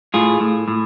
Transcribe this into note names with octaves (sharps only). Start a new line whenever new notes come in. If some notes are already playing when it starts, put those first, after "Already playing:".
A2 F4 G#4
A2
A2